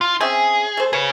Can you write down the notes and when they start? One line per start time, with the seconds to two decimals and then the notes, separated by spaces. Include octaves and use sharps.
0.01 F4
0.21 C4 C#4 G#4 E5
0.77 A3 C5
0.93 G#4 B4 C#5